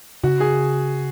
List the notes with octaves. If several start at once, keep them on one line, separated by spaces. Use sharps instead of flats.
C#3 F#4
G#4